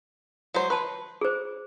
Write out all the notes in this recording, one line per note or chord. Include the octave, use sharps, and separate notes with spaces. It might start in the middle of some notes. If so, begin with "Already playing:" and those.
F#3 G#3 C5
B4 A5 C6
G#4 C5